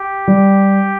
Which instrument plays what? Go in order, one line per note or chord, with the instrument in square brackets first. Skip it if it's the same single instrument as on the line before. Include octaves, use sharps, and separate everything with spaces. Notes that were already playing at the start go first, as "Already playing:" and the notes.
Already playing: [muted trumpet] G4
[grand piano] G3